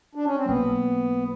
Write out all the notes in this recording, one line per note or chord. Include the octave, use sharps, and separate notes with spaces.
D4
C#4
C4
B1 B2 F#3 A#3 B3